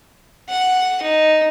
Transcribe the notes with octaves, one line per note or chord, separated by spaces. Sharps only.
F#5
D#4